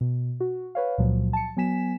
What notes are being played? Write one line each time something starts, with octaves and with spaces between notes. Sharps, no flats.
B2
F#4
B4 C#5 F5
C#2 A#2 F3 F#3
A5 C#7
F#3 B3 G#5 B6 E7